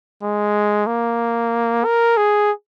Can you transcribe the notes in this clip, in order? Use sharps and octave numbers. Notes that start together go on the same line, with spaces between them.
G#3
A#3
A#4
G#4